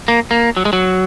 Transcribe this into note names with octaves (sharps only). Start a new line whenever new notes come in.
A#3
A#3
F#3
G#3
F#3